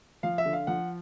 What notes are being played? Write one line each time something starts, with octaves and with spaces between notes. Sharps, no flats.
F3 F5
E5
D3
F5
F3 F#5